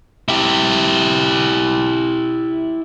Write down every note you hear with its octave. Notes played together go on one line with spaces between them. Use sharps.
E4 G4